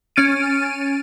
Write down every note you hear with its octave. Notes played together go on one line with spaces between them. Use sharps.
C#4 F6 A6 D7 D#7